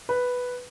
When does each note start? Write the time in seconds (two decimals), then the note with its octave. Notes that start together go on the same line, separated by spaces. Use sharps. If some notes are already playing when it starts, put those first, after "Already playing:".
0.09 B4